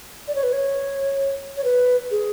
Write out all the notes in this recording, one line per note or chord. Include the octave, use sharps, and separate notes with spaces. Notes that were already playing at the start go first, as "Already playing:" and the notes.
D5
C#5
B4
C#5
C#5
B4
G#4